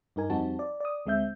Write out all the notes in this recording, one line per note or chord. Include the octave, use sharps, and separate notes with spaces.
G2 D#4 A#4 G#5
F2 G3 C4 D#4 F#4 A5
D5
D5 D#6
D2 G#3 C4 E5 G6